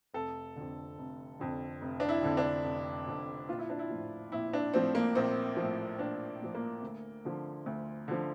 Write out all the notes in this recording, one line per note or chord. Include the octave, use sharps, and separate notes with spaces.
F1 A4
F2 D3
F1
F2 D3
F1
D4
E4
F2 D3
D4
F1
F2 D3
A#1 F4
E4
D4
E4
A2 F3
A#1 E4
D4
A2 F3 C4
A#3
A#1 C4
F3
A2
A#1 D4
A2 F3
A#3
D2
D3 F3
D2
D3 F3